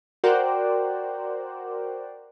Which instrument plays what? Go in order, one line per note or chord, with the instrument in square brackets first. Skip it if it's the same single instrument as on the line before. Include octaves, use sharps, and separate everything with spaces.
[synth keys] F#4 A#4 C5 D5 F#5 G5